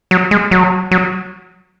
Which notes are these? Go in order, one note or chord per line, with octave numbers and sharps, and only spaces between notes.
F#3
G#3
F#3
F#3